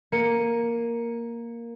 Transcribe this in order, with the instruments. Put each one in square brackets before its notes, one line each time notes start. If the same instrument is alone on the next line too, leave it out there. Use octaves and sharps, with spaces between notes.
[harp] A#3 C#7 D#7